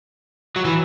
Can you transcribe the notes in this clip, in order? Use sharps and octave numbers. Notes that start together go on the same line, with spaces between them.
F#3
E3